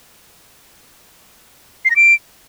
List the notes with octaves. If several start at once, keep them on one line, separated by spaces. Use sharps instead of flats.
C7
A#6
D7